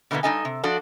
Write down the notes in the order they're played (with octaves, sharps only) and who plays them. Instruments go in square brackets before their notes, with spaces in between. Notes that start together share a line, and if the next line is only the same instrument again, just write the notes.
[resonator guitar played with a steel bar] B2 D3 E3 F3 A#3 B3
G2 G#3 D#4 A4 D#5 G#5
C3
F3 D4 F#4 A4 D5